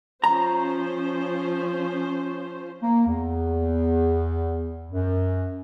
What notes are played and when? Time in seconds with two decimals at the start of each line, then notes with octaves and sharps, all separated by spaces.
0.24 F3 C#4 C5 A#5
2.82 A#3
3.07 E2
4.90 F#2